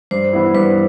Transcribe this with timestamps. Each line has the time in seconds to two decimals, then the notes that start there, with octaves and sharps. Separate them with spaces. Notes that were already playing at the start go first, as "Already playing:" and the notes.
0.11 G2 C5
0.33 E3 B3 E4
0.54 G2 B4